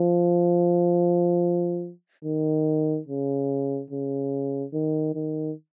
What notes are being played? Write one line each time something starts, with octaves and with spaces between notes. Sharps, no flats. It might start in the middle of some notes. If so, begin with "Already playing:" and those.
Already playing: F3
D#3
C#3
C#3
D#3
D#3